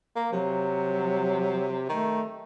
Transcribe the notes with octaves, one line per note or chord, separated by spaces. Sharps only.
A#3
C3 F#3
D#3 A3